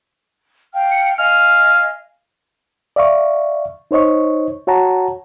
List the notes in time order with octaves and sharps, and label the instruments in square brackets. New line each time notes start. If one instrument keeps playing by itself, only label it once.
[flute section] F5 G5 F6
[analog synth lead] C#7
[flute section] D#5 F5 G#5 [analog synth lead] F6
[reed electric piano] D5 E5 F5 C#6
D#4 C5 C#5 D#5 C#6
F#4 C#5 F#5 A5 A#5